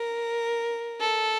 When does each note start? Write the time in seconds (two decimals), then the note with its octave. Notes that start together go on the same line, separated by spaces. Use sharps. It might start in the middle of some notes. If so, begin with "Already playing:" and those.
Already playing: A#4
1.01 A4